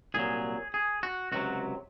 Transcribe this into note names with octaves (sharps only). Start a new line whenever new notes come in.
C2 A#2 F#3 G#4
G#4
F#4
C#2 C3 F#3 F#4